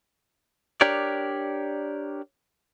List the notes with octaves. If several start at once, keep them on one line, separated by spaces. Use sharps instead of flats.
D4 G4 A#4 C#5 D5